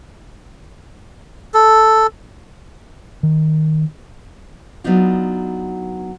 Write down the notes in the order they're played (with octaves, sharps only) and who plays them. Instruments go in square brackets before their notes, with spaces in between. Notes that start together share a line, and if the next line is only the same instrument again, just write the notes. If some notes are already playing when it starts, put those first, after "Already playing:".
[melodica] A4
[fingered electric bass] D#3
[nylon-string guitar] F#3 B3 D4 D#4 F4